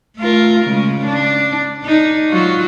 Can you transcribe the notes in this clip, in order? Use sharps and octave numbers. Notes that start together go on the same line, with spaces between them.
A3 F4 A#4
C#3 G#3
D4
D4 D#4
F#3 F4 F#4